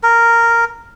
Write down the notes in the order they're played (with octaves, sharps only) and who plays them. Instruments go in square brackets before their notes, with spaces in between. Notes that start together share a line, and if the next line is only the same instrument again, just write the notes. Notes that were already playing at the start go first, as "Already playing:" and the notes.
[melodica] A#4